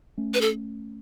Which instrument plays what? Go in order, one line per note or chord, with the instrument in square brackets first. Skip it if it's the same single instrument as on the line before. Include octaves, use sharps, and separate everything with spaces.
[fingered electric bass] A3 C#4
[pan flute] B4
A4